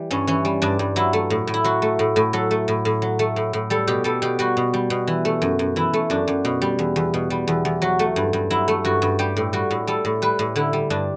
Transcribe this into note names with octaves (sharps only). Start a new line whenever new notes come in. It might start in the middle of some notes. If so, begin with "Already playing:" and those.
Already playing: E3 G3
G2 C#4
E3 C#4
G3
G2 D4
G2
F#3 E4
A3
A2
A2
E4
F#3 F#4
A3
A2
A2
F#3 A4
A3
A2
A2
F#3
A3
A2
A2
G3 A4
B2 G4
G3 A4
B2 G4
G3 F#4
B2
G3
B2
E3
A3
F#2
F#2
E3 E4
A3
F#2 D4
F#2
B2
G3
E2
E2
B2
G3
E2
E2
F#3 F#4
A3
G2
G2
F#3 E4
A3
G2 F#4
G2
G3 G4
A2
G3 F#4
A2
G3 A4
A2
G3 B4
A2
D3 E4
G3
G2 D4